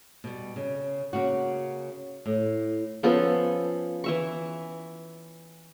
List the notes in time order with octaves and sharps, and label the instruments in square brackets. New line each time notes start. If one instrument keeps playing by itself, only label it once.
[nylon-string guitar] B2 G3
C#3
C#3 A#3 F#4
A2
[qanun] F3 B3 C#4 A4
E3 E5 C#6